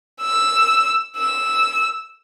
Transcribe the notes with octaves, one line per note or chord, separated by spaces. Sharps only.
E6
E6